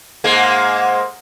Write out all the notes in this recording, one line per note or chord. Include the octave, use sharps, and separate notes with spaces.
G#2 G#3 A#3